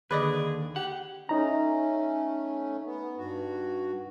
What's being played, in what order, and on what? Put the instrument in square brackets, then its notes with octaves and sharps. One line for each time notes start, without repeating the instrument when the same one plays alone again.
[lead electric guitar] D#2 [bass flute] D3 [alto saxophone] G#4 [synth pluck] B4 D5 D#5
[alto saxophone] G4 [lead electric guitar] F#5
[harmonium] A3 C#4 [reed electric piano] D#4 A#5
[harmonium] B3
G2 F#4